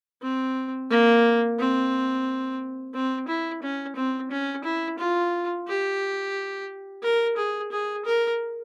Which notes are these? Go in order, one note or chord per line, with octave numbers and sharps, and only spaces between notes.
C4
A#3
C4
C4
E4
C#4
C4
C#4
E4
F4
G4
A#4
G#4
G#4
A#4